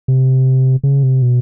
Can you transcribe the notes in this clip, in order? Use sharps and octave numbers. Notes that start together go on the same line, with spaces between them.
C3
C#3
C3
B2